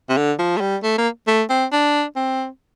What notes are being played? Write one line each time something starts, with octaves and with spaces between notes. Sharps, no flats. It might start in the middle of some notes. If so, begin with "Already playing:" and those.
C3
D3
F3
A3
G3
A3
A#3
A3
C4
D4
C4